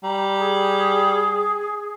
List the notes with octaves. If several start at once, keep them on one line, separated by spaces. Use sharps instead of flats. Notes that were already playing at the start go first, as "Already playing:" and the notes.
G3 A#5
G#4